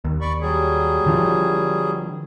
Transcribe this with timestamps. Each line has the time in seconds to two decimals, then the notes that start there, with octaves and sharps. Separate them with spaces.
0.05 D#2
0.21 D5 B5 C#6
0.41 F#3 G3 G#4
1.06 D3 F3